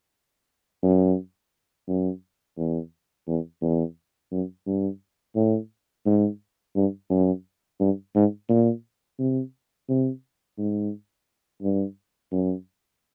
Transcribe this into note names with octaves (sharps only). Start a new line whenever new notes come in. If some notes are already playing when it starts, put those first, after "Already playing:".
F#2
F#2
E2
E2
E2
F#2
G2
A2
G#2
G2
F#2
G2
G#2
A#2
C3
C3
G#2
G2
F#2